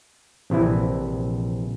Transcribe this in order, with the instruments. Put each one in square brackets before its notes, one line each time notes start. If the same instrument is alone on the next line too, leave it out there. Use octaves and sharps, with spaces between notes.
[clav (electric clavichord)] A#1 C3 E3 E4